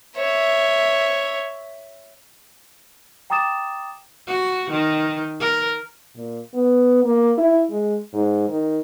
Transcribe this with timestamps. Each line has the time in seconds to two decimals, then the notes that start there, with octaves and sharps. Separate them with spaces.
0.17 C#5 E5
3.30 G5 A#5 D6 D#6 A6 E7
4.27 F#4
4.70 D#3
5.40 A#4
6.15 A#2
6.54 B3
7.04 A#3
7.38 E4
7.71 G#3
8.13 G#2
8.49 D#3